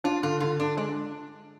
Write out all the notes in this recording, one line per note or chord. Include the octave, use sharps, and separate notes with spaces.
D4 F4
D3 F4
D3 F4
D3 D4
G#3 D4